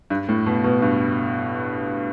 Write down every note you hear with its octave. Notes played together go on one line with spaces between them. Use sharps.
G2
A2
B2
B2
G2